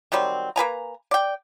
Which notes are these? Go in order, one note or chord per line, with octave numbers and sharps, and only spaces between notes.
D#3 F#3 G3 C4
A#3 B4 G#5 A#5
D5 G5